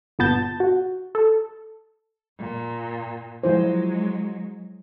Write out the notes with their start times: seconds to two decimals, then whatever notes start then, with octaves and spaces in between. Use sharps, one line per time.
0.19 G1 A#2 B3 A5 G6 A6
0.60 F#4
1.15 A4
2.39 A#2
3.43 F3 F#3 G#3 E4 C5